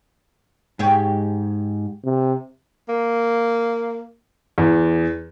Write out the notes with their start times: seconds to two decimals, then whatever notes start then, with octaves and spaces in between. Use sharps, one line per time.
0.79 G#2 G4 G#4 C#5
2.05 C3
2.89 A#3
4.58 E2